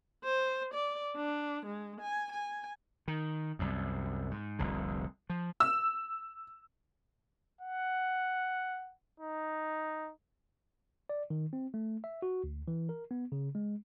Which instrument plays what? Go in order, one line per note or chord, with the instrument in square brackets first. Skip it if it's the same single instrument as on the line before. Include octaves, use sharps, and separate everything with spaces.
[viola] C5
D5
D4
G#3
G#5
G#5
[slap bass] D#3
C2 F#2
G#2
F1 C2 D3
F3
[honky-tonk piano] E6
[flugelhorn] F#5
D#4
[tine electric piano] D5
D#3
C4
A3
E5
F#4
D2
E3
A#4
B3
C#3
G#3